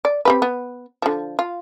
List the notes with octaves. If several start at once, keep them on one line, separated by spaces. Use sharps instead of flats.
D5
C4 G4 B4
B3
D3 F3
F4